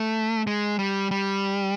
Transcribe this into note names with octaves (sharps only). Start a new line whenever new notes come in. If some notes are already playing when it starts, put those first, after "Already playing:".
Already playing: A3
G#3
G3
G3